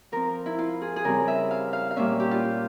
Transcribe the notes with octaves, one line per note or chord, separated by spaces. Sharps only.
F3 C4 A#4
E4
F4
G#4
G#4
C#3 G3 C4 A#4
E5
F5
F5
F5
A#2 G3 A#3 C#4 E5
G4
F4